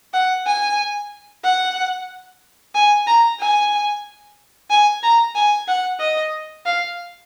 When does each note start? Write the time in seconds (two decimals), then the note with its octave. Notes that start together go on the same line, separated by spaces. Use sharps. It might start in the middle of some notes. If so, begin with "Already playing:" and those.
0.14 F#5
0.46 G#5
1.44 F#5
2.75 G#5
3.07 A#5
3.40 G#5
4.70 G#5
5.03 A#5
5.35 G#5
5.68 F#5
6.00 D#5
6.66 F5